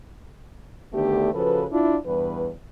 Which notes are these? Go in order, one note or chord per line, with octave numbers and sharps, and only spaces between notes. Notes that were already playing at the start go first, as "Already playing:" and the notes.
D2 D3 D#3 A3 B3 G4
C#3 F3 F#4 A4 B4
D4 E4 F4
E2 G2 B4